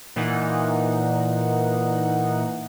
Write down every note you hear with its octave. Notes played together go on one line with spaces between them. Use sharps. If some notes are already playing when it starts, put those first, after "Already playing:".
A#2 E3 D#4 F#5